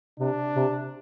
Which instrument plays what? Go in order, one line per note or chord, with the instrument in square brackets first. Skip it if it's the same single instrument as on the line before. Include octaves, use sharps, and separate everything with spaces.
[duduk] C3 [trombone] D4
[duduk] C3